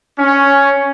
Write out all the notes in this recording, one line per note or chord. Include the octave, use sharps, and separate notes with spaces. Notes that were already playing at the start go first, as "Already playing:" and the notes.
C#4